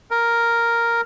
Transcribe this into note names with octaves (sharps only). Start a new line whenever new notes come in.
A#4